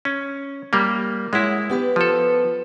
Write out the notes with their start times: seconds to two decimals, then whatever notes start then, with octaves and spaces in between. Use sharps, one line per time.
0.05 C#4
0.73 G3 A#3
1.33 G#3 E4 C#5 F#5
1.69 B3 G4 B4
1.96 F3 A4